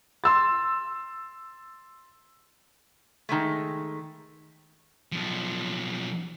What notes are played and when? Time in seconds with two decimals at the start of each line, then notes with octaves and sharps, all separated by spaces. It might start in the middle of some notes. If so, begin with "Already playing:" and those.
0.24 C6 E6 A6
3.29 D#3 G#3 A3
5.12 B1 F3